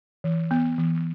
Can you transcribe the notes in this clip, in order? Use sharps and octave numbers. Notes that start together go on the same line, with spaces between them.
E3
B3
E3